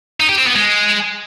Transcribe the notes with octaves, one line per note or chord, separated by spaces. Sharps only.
D#4
G4
C4
B3
G#3